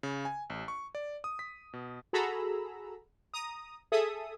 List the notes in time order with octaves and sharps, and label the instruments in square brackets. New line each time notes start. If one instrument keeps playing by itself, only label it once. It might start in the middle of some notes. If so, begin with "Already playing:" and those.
[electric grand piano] C#3
G#5
A1
C#6
D5
D#6
B6
B2
[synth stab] F#4 G#4 A4 A#5 B5 E6
A#5 D#6
G#4 A4 E5 D#6